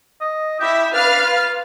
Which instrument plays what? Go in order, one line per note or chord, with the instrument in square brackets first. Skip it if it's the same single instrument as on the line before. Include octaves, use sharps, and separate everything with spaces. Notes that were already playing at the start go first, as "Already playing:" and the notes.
[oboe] D#5
[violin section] E4 E5 [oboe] G4
[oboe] D4 [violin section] B4 F5 F6
[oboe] F4